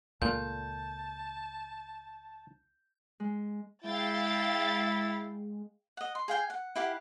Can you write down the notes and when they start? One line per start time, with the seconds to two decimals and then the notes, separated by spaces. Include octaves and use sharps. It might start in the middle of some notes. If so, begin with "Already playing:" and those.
0.22 C#2 A#2 A3 A5 G6
3.20 G#3
3.84 G#3 E4 F5 G5 A6
5.97 D#5 F#5
6.15 C6
6.28 G#4 F5 G5 G#5
6.50 F#5
6.76 E4 G4 F5 F#5